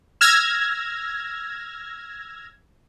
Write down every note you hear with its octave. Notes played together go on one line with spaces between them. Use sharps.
E6 F6 G#6 A#6